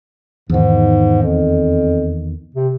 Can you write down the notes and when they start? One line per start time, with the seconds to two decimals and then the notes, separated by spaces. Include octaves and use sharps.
0.50 E2 G#2 D#3
1.23 F2
2.55 C3